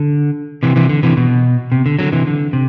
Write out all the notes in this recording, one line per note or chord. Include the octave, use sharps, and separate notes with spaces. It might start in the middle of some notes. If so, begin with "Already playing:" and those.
Already playing: D3
C3 E3
C3 E3
D3
C3 E3
B2
C3
D3
D3 F#3
C3 E3
D3
C3